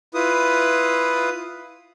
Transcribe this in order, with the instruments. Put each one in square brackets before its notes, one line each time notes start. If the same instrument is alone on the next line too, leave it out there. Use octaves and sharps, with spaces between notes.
[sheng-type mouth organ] E4 F4 B4 D#6